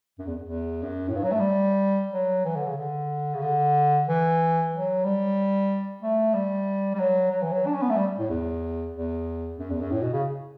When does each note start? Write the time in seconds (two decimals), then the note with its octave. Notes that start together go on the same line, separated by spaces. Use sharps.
0.18 F#2
0.26 E2
0.42 E2
0.82 F#2
1.08 A2
1.15 G2
1.24 F#3
1.31 A3
1.39 G3
2.12 F#3
2.45 E3
2.56 D3
2.67 C#3
2.76 D3
3.34 C#3
3.42 D3
4.08 E3
4.73 F#3
5.04 G3
6.03 A3
6.34 G3
6.95 G3
6.99 F#3
7.31 F#3
7.42 E3
7.52 F#3
7.66 D4
7.74 C#4
7.81 B3
7.89 A3
7.96 G3
8.19 A2
8.29 E2
8.94 E2
9.58 F#2
9.70 E2
9.81 F#2
9.91 A2
10.02 B2
10.13 C#3